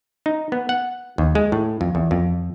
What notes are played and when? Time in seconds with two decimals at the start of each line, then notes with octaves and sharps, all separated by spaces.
0.26 D#4
0.52 B3
0.69 F#5
1.18 D#2
1.35 G#3
1.52 A2
1.81 F2
1.95 E2
2.11 F2